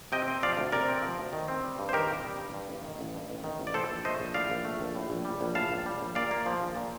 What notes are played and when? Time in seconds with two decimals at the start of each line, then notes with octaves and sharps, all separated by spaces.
0.12 C3 D#5 G5
0.28 C4
0.43 F3 D5 F5
0.57 D2
0.72 C3 A#4 D5
0.88 C4
1.02 F3
1.18 D2
1.33 D#3
1.48 C4
1.64 G3
1.79 G2
1.89 C5
1.93 D#3 G4 A#4
2.08 C4
2.24 G3
2.38 G2
2.53 G2
2.68 A1
2.85 D#3
2.99 A1
3.14 G2
3.30 A1
3.44 D#3
3.59 A1
3.67 D5
3.74 A2 A4 C5
3.90 A#1
4.05 A3 C5 D#5
4.20 A#1
4.34 A2 D5 F5
4.50 A#1
4.65 A3
4.81 A#1
4.95 A2
5.10 A#1
5.25 G3
5.41 A#1
5.55 A2 F5 A5
5.70 A#1
5.86 G3
6.01 A#1
6.15 A#2 D5 F5
6.31 A#3
6.46 F3
6.61 A#1
6.76 A#2